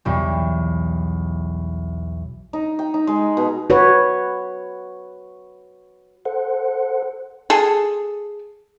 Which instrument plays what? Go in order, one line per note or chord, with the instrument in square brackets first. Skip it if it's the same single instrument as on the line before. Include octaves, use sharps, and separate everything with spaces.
[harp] B1 E2 G3
[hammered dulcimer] D#4
G5
D#4
G#3
B2
[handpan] F#4 B4 C#5
[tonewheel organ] A4 C5 F#5
[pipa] G#4 A4